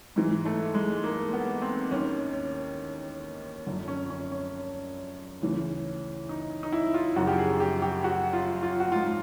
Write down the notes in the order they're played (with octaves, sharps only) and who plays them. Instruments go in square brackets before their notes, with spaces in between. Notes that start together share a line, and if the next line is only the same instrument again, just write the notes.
[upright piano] G#2 E3
A3
G#3
A#3
B3
C4
D#2 D#3 C#4
F#2 D3 F3
C#4
C#4
C#4
D2 C#3 E3
D#4
D#4
E4
F4
F#2 C#3 F3 F#4
G4
G#4
G4
G4
F#4
F4
F4
F#4
G#2 F3 F4